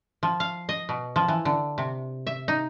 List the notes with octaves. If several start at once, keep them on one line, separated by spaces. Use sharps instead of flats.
F3
F5
D#5
B2
F3
E3
D3
C3
E5
D#4